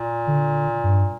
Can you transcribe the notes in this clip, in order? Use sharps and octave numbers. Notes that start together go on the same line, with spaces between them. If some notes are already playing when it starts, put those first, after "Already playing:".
Already playing: A#2
D3
G2